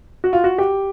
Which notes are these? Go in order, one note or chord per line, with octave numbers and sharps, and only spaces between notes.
F#4
F4
F#4
G4